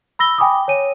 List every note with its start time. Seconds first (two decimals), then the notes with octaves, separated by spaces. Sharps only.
0.19 B5 E6 A#6 G7
0.38 G5 G#5 B5 D6 D#6
0.68 C#5 G#5 D#7